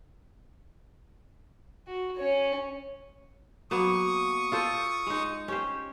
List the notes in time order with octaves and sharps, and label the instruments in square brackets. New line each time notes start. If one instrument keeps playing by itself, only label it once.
[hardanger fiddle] F#4
C#4 C#5
[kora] F#3 A#3 B3 [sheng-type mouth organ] C#6 D#6
[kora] F4 A4 C5
G#3 D#4
C#4 G4 C5